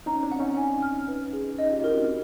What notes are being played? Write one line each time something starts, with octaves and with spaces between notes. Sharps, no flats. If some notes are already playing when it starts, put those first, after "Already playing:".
C#4 D#4 A#5
C4 D4
F#5
C#4 D#4
G#5
F6
B4
G#4
C#4 D#4 D#5
F4 G4
E4 F#4 A#4
C4 D4